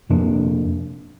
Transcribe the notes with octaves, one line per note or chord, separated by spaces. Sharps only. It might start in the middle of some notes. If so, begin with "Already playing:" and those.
F2 C3 A#3 D4